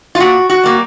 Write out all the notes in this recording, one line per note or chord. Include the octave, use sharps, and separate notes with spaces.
F4
A#2 F#4
F#4
G3 A#3